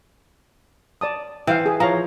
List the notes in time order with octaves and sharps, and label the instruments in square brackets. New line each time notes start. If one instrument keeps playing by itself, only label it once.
[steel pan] D5 A5 D#6
[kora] E3 C5 [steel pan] F5 G5
[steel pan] G#4
[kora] F3 [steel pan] C#5 F5 A#5